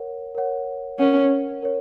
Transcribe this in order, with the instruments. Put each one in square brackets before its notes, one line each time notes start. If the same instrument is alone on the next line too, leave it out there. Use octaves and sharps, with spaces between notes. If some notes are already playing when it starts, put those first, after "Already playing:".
Already playing: [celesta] A#4 C#5 F#5
A#4 C#5 F#5
[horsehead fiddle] C#4 [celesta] A#4 C#5 F#5
[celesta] A#4 C#5